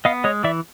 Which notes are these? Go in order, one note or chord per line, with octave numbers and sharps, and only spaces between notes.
B3 D#5 F5
G#3 C#5 D#5
E3 D5 E5